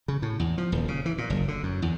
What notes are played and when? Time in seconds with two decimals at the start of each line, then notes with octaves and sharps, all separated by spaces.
0.08 C#3
0.22 A2
0.40 E2
0.58 F3
0.72 D#1
0.88 C#3
1.06 E3
1.18 A#2
1.30 F#1
1.48 D3
1.63 F#2
1.82 E2